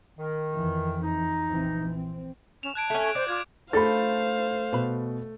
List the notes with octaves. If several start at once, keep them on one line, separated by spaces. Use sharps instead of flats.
D#3
F2 E3
D#4
A#1 E3 C4
C4
C#4 E7 F7
A5 F#6 G#6 D7
A3 C#4
C5 D5
F4 D6 G#6
A3 D4 F4 A4 C5 F5 B5 A6
B2 B4 B5